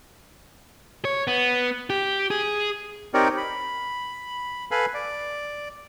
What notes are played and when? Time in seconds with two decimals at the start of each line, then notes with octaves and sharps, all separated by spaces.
1.05 C#5
1.27 B3
1.90 G4
2.30 G#4
3.14 C4 D#4 G4 A#4 C#5 D5
3.37 B5
4.71 A4 B4 F5 G#5 B5
4.94 D5